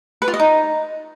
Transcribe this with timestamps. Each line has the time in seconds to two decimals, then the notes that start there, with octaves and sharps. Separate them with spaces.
0.22 B4
0.28 F4
0.34 D#5
0.40 D#4